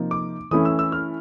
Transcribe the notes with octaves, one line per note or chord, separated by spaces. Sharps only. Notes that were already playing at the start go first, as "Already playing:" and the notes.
Already playing: C3 F3 A#3 D#4
D6
E3 A3 C#4 E4 D#6
E6
E6
F6